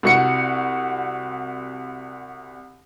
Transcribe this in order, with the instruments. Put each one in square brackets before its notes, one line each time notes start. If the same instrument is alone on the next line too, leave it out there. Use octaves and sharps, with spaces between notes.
[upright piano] C2 F#4 C#7